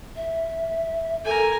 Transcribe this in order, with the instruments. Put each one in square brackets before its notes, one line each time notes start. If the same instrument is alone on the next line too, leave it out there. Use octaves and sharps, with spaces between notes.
[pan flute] E5
[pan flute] A4 [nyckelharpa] A#4 G#5